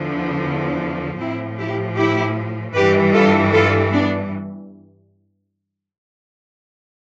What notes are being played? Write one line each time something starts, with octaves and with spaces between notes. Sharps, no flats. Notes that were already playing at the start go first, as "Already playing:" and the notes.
Already playing: E2 D3 F3
A2 F3 C4 E4
E4 G4
E4 G4
G2 E3 G3 G4 B4
F4 A4
F4 A4
B3 D4